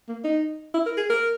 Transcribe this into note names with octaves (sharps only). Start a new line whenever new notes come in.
A#3
D#4
E4
A#4
G#4
A#4